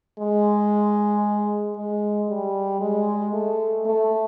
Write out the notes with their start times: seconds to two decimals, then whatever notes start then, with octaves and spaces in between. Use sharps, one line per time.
0.19 G#3
1.76 G#3
2.29 G3
2.81 G#3
3.33 A3
3.86 A3